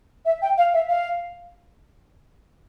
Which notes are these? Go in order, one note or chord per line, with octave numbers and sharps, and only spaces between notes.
E5
G5
F5
E5
F5